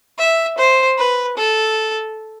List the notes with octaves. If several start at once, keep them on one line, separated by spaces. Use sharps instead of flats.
E5
C5
B4
A4